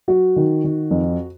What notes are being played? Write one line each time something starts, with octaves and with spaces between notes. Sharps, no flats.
F#3 F#4
D#3
D#3
F2